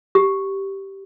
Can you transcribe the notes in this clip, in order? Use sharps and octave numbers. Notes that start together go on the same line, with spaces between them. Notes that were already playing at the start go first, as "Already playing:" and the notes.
G4